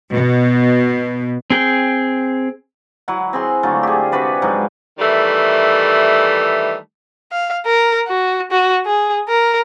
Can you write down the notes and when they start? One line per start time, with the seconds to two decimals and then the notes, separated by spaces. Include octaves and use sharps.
0.13 B2
1.50 C4 G#4 G5
3.08 F#3 E4 F#5
3.33 C4 G#4 C6
3.63 D3 F#3 A3 F4
3.83 G4 G#4
4.12 C3 F#4 B4 D5
4.42 G#2 F3 F#3
4.99 D#3 E3 G3 A3
7.32 F5
7.66 A#4
8.08 F#4
8.51 F#4
8.86 G#4
9.28 A#4